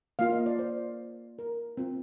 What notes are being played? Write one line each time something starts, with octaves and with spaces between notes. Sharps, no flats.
A#3 F4 F5
D#5
D5
C5
A#4
C4 F4